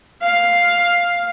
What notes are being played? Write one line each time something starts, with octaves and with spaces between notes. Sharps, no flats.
F5